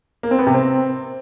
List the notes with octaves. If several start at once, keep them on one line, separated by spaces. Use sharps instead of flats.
A#3
C4
B3
C3
C4